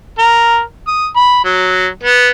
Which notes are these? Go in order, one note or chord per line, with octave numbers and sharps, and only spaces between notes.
A#4
D#6
B5
F#3
B3